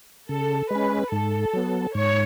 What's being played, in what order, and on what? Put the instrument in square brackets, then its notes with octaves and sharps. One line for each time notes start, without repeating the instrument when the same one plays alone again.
[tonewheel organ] C#3 [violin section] A4
[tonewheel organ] G#3 C#4 [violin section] B4
[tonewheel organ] G#2 [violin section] A4
[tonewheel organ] F#3 B3
[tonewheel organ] G#2 [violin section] C#5